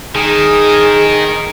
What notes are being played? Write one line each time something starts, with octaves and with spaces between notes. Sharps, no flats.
D#3 G#4